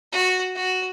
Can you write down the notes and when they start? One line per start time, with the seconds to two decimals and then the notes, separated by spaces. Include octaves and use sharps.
0.13 F#4
0.55 F#4